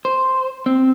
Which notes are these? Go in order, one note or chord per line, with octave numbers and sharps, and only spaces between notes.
C5
C4